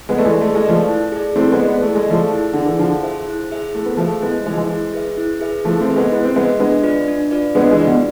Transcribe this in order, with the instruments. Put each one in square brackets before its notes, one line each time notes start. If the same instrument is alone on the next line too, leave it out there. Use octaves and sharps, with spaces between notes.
[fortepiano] G#3 B3
[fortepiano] A3 [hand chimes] B4 D5
[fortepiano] E3 G#3
[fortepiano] A3 [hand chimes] G#4
[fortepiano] G#3
[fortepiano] F3 A3 [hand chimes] B4 D5
[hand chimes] E4
G#4 D5
[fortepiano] A3 C4 [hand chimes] E4
[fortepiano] G#3 B3
[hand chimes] G#4 D5
[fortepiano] B3
[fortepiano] A3 [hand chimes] E4
[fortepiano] G#3
[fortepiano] F3 A3 [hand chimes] G#4 D5
[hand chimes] E4
[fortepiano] D3 [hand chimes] G#4 D5
[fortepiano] E3
[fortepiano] D3 F3 [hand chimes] E4
[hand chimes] G#4 C5 E5
E4
G#4 C5 E5
[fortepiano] A3 [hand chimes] E4
[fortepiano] B3
[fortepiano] F3 A3 [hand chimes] G#4 C5 E5
[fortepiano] G#3 B3 [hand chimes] E4
[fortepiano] E3 G#3 [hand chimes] G#4 C5 E5
[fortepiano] F3
E3 G#3
[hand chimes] E4
G#4 B4 E5
E4
G#4 B4 E5
[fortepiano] F3 A3 [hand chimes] E4
[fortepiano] A3 C4
[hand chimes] G#4 B4 E5
[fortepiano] G#3 B3
[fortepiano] B3 [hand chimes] E4
[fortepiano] C4
[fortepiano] G#3 B3 [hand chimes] G#4 B4 E5
[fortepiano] G#3 B3 [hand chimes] D4
[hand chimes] F4 B4 D5
D4
F4 B4 D5
[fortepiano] G#3 B3 [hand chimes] D4
[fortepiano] E3 G#3
[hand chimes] F4 B4 D5
[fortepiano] B2